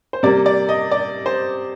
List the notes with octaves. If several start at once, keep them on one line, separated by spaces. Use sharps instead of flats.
C5
C3 G3 A#3 D5
D5
D#5
D5
C5